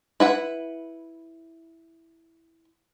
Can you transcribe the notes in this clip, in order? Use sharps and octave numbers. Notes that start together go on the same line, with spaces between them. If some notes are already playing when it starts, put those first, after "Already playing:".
E4 B4 F#5